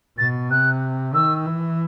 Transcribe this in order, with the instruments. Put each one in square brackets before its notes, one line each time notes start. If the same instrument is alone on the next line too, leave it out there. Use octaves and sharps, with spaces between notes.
[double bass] B2 [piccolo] A6
[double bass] C3 [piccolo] F#6
[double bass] D#3 [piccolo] E6
[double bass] E3